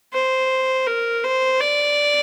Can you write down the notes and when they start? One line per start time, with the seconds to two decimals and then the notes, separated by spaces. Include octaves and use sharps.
0.13 C5
0.87 A#4
1.24 C5
1.60 D5